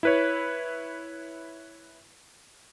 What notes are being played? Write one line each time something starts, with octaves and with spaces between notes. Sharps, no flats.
E4 B4 C#5